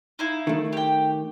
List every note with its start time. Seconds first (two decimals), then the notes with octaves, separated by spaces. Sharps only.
0.19 D#4 E4 F5
0.47 D#3 A3
0.73 G4 G5